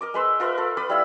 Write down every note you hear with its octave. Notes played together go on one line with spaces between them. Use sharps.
A#4 D#5 D6
G#3 B4 C6 E6
F4 A#4 B4 E5
F4 A4
B4 D5 B5 D#6
G3 E4 F5 E6